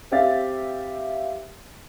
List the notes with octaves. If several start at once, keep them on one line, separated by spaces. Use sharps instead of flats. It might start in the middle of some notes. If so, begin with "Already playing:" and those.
C4 G4 E5 F5 A6